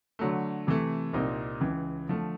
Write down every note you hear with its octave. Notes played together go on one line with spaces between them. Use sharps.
D3 F#3 A3
C3 E3 A3
C2 A#2 G3 C4 D#4
C#2 C#3 E3
D3 F3 A3